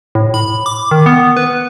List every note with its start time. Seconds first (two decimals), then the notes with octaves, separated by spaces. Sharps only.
0.15 A2
0.34 B5
0.66 D6
0.91 D#3
1.06 B3
1.37 B4